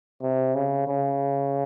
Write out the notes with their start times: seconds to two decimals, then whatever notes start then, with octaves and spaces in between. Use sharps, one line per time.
0.22 C3
0.55 C#3
0.87 C#3